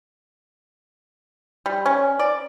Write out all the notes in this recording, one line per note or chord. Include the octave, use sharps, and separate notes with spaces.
G3
C#4
D5